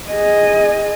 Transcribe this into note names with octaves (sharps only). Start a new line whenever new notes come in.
G#4 D#5